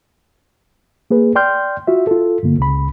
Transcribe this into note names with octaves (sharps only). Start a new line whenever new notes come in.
A#3 G#4 B4
D5 G5 C6 F6 G6
F4 F#4 E5
F4 A4
G2 D3 A#3
C#2 C#3 B5